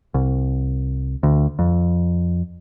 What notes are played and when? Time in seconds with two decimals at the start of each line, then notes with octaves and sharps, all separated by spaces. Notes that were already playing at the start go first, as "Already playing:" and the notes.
0.14 C2
1.23 D2
1.59 F2